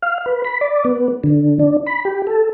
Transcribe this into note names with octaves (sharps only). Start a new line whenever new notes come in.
F5
B4
B5
D5
B3
D3
D4
B5
G4
A4